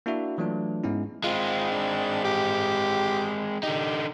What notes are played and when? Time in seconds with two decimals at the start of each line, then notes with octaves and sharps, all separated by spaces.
0.06 A#3 D4 E4 F#4 E5
0.38 E3 F#3 A3 D4 F4
0.83 G#2 G#3 B3 C#4 D#4 E4
1.24 G#3 C4 F4
1.71 D4
2.24 G4
3.63 D3 D#4 G4